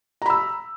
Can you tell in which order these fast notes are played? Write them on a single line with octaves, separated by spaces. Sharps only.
A#5 B5 E6